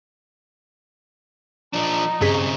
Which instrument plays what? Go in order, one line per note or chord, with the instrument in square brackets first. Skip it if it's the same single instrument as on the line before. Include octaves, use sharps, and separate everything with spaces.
[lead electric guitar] F3 D4 [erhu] D#4
[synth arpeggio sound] G2 G#4 B6 [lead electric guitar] C#3 C4